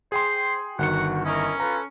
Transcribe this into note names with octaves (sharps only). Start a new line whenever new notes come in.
G#4 C5 G5 C6
G1 D#3 F#4 F#5 C#7
C#4 E4 A#4 D#5
F4 A4 B4 A#5